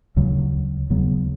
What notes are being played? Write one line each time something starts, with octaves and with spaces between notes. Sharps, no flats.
D2 C#3 F#3
D#2 C#3 F#3 B3